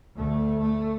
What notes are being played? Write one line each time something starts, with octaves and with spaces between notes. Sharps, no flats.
D2 A3
A3